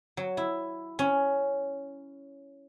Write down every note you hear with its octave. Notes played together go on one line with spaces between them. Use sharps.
F#3
E4
C#4